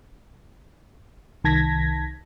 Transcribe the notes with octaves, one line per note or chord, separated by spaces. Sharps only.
C2 D#3 A5 G#6 A#6 B6